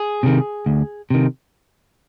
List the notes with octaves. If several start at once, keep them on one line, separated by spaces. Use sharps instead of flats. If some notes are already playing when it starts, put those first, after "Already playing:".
Already playing: G#4
C3 D#3
D2
C3 D#3